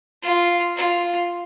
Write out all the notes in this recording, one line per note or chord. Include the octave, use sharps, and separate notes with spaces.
F4
F4